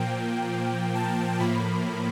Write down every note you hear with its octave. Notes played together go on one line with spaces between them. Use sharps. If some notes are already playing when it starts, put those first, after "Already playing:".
Already playing: A#2 F3 A#3 G5
A5
A2 F3 A#3 B5